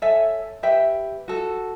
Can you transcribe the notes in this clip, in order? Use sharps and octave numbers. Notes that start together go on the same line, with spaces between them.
A4 C#5 E5 G#5
G4 B4 E5 G5
F#4 A4